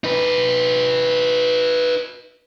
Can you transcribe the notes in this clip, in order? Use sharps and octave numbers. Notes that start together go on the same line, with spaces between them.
D#4 B4